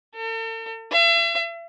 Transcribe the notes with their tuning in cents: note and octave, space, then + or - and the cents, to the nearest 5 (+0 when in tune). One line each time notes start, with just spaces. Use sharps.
A4 +45
E5 +40